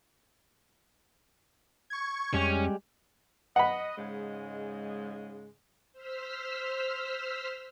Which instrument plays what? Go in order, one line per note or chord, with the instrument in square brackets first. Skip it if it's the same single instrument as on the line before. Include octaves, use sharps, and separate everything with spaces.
[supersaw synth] C#6 G#6
[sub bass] F2 [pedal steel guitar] G3 G#3 G4 [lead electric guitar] C#4
[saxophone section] D#5 [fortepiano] F#5 B5
[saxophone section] G#2 C#3 G#3
[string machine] C5 E6 F6 B6